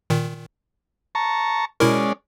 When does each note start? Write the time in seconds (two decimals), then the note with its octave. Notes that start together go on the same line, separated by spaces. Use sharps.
0.10 A#2 D#3
1.15 A5 A#5 C#6
1.80 B2 G#3 C#4 E4 A#4 D5